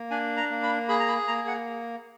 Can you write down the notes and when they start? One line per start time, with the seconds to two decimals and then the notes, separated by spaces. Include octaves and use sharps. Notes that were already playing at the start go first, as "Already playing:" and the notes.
Already playing: A#3
0.11 D4 G#5
0.37 A#5
0.50 A#3
0.63 B5
0.89 G#4 B5
1.00 A#5
1.08 B5
1.28 A#3 A#5
1.48 F#5